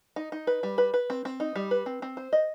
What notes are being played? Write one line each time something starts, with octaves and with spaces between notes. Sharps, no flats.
D#4
D#4
B4
G3
B4
B4
C4
C4
D#4
G3
B4
C4
C4
C5
D#5